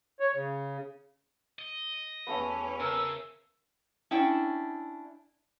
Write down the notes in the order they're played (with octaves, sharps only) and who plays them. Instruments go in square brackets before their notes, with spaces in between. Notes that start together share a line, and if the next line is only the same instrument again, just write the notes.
[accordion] C#5
C#3
[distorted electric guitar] D#5
[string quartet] E2 C#4 [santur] A3 B3
[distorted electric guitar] C#3 [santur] A#4 [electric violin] E6
[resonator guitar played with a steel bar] C#4 D4 E4 G5